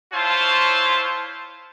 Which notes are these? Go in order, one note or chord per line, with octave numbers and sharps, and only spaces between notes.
E4 F4 C5 C#5 A5